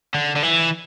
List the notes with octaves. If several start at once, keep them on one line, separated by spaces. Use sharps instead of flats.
D3
D3
E3